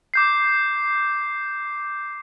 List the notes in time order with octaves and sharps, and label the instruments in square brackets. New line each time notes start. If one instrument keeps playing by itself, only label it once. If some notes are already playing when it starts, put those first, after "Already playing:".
[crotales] D6 G6 C7